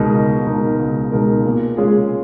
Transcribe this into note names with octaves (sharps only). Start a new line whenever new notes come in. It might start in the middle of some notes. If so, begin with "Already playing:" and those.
Already playing: C#2 B2 G#3 D#4 A#4
C#2
B2 G#3 D#4 A#4
C#2
B2 G#3 D#4 A#4
A#2
G#3 C#4 F4 G#4